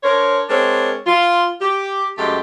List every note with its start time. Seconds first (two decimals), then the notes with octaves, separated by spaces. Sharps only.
0.03 D4 A#4 C5 C#5
0.49 G#3 C4 D4 A#4 C#5
1.07 F4
1.61 G4
2.18 F#2 G#3 A3 G4